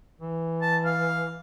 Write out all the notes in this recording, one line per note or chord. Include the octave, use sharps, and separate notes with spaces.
E3
A5
F5